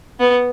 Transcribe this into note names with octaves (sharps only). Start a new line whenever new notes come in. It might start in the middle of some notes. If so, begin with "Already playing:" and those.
B3